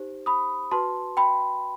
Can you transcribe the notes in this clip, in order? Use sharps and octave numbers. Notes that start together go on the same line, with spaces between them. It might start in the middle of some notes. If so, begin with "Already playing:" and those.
Already playing: D#4 G4 C5
B5 D#6
F#4 B4 A5 C6
G5 B5